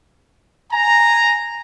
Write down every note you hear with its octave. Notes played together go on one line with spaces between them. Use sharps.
G#5 A#5